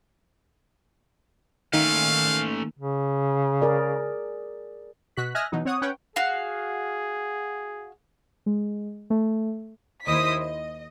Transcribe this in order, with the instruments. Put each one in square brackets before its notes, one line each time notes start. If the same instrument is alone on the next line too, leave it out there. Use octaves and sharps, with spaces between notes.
[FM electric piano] D#3 A#3 [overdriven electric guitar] A3 C#4 [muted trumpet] F5
[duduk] C#3
[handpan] G#4 A#4 D5
[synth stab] B2 F#4 F#6 B6
D#5 E5 G#5 F6 F#6 A#6
B2 E3 F#3 D#4
C4 C#5 F#5 D#6
C#4 B4 C#5 F#5 G5
[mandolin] F#4 F5 [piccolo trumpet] G#4
[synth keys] G#3
A3
[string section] D#2 E4 C5 D#5 D#6 B6
D#5